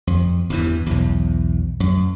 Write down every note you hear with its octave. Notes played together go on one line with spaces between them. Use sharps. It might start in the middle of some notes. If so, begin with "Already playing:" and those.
F2
E2 G2 E3
B1 E2
F#2